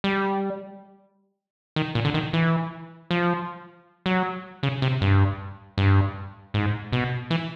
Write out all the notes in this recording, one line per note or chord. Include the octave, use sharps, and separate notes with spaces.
G3
D#3
A#2
D3
D#3
E3
F3
F#3
C#3
C3
G2
G2
G#2
B2
E3